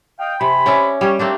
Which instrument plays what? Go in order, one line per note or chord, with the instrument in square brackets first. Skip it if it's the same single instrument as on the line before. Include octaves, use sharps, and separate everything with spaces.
[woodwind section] D#5 F5 G5
[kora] C3 [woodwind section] C5 G#5 B5
[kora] C#4 D5 E5
[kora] G3 G4 [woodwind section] C#4
[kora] A3 A#3 D4 [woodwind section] C4